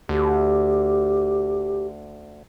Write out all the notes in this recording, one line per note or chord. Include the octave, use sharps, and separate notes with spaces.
D2 G4